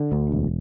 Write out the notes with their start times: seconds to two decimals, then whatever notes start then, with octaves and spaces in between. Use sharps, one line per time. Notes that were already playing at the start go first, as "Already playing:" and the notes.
Already playing: D3
0.12 D2
0.32 E1